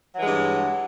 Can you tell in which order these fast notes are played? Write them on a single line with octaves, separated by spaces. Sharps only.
F#3 E3 G#3 G2